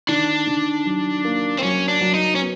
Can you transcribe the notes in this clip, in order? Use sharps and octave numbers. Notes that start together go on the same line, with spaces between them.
D#3 D4
D#3
F#3
A#3
C4
F#3 C#4
D4
F#3
D#4
C#4
B3